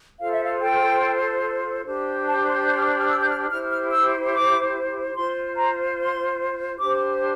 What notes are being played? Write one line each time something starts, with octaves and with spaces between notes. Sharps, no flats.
F4 A4 C5 F5
E5
F5
G5
D4 G4 C5
A5
C6
G6
F6
F6
E6
G6
F6
E4 G4 C5 F6
F6
E6
D6
F4 C5 C6
A#5
C6
D4 G4 C5 D6